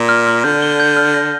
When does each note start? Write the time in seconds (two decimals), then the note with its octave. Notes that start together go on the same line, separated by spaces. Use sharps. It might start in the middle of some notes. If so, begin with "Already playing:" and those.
Already playing: A#2
0.09 F6
0.27 F6
0.44 D3 G6
0.62 G7
0.80 G6
0.97 F6
1.14 A#6